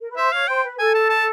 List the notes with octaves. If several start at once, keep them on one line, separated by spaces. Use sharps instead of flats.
A#4
B4
C5 E5
C#5 F5
C5 G5
B4
A4 G#5
A5
A5